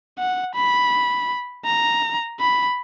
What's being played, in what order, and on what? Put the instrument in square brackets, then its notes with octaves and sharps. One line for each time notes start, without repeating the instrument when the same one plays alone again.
[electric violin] F#5
B5
A#5
B5